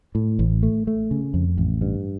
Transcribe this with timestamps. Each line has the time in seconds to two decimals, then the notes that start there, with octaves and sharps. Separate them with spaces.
0.15 A2
0.39 A1
0.63 A3
0.87 A3
1.11 C#3
1.34 F2
1.58 A1
1.81 G2